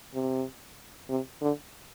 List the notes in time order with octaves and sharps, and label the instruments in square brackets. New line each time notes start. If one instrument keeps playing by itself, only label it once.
[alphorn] C3
C3
D3